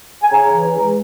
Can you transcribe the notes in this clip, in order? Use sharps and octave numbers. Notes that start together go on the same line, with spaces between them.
G#5
C#3 A#5
E3
E2
G#3